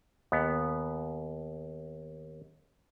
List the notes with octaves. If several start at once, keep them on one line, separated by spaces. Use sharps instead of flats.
D#2 B3